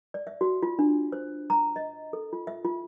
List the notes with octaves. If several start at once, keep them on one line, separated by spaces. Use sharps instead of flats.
D5
E5
F#4
F4
D4
C5
A#5
D#5
A4
F4
E5
F4